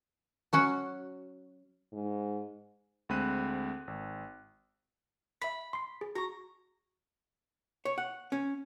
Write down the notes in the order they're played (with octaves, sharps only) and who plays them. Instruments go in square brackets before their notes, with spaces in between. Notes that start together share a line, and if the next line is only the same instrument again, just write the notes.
[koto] F#3 C#4 F#4
[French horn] G#2
[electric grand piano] D2 G#3 C4 B5 F#6 D#7
G#1
[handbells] E5 B6 [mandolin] B5
[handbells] C6 C7
G#4
[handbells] F#4 C#6 [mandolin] A#5
[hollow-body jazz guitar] C#5
F#5
C#4